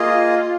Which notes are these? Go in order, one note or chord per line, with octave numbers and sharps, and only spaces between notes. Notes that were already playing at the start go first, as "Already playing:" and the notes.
Already playing: A#3 F4 G#4 D#5